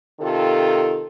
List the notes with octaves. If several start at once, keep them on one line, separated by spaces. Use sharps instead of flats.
C3 D#3 F4 A4